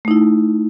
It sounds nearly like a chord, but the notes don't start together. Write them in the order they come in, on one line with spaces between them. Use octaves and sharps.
A3 D#4 E4